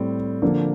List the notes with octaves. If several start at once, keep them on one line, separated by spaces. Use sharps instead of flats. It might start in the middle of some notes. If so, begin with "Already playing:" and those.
Already playing: A2 G3 C4
D3 F3 A#3